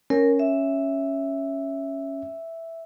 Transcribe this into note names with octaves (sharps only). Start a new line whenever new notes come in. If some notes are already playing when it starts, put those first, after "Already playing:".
C#4 A#4
E5